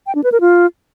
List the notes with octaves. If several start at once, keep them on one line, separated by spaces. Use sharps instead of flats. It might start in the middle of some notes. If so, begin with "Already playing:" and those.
G5
D4
B4
A#4
F4